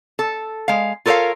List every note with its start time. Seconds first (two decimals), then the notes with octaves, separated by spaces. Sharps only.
0.19 A4
0.68 G#3 F5
1.06 F4 A4 A#4 C5 C#5 F5